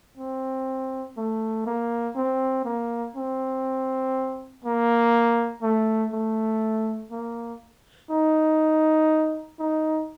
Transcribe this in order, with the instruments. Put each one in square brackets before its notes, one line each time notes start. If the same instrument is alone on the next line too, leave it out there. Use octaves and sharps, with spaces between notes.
[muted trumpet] C4
A3
A#3
C4
A#3
C4
A#3
A3
A3
A#3
D#4
D#4